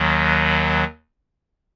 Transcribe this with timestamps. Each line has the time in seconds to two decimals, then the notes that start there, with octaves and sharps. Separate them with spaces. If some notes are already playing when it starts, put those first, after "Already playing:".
Already playing: D#2 D#3 F#3